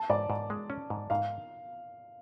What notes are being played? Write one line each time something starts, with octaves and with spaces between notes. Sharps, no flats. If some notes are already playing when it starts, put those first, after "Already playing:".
Already playing: A5
G#2 D5
G#2
G#3
C#4
G#2
G#2 F5